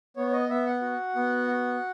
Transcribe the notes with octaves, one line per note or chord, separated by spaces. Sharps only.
B3 C#5
C#5
D#5
B3 E5
F#5
F#4
B3
F#4